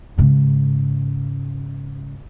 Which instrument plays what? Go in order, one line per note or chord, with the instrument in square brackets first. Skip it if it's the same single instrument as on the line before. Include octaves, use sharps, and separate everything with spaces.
[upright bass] G#2 C#3